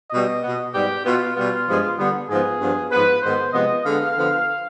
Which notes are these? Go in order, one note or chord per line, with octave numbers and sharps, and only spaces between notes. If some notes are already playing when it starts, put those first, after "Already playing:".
B2 G3 B3 D#5
B2 B3
G#2 G3 B3 G4
B2 B3 F4
B2 G3 B3 F4
G2 F3 G#3 B3
D3 G3 B3
G#2 F3 B3 G#4
G2 F3 B3
G#2 F3 B3 B4
G#2 D#3 B3 C5
C3 F3 G#3 B3 D#5
D3 G#3 B3 F5
D3 F3 B3